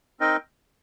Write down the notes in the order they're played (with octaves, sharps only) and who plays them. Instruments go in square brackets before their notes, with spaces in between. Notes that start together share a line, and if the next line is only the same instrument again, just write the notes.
[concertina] C4 D#4 A#4 D#5 G5